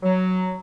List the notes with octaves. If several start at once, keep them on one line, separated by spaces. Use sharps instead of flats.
F#3